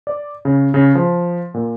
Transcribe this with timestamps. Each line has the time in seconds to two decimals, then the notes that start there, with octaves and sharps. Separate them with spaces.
0.07 D5
0.45 C#3
0.74 C#3
0.95 F3
1.54 A#2